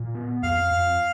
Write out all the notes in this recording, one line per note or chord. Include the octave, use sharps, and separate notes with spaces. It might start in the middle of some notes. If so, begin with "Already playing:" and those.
Already playing: A#2
B3
F2 F5
F2